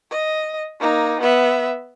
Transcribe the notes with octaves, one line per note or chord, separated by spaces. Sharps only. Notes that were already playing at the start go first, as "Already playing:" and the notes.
D#5
A#3 D#4
B3 E5